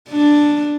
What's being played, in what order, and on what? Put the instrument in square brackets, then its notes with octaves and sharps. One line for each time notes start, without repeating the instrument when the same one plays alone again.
[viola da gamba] D4